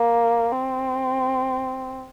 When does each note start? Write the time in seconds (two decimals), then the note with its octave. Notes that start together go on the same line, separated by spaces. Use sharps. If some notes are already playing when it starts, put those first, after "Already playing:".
Already playing: A#3
0.52 C4